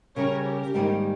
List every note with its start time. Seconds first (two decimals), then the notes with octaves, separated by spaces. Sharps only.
0.16 C#3 G3 C#4 A#4 C#5
0.44 G4 A#4
0.74 G#2 D#3 G3 A#3 D#4